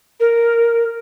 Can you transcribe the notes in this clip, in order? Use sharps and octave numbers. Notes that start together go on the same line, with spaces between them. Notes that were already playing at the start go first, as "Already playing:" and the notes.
A#4